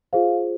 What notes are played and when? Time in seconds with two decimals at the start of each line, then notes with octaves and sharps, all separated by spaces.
0.13 F4 G#4 C5 F5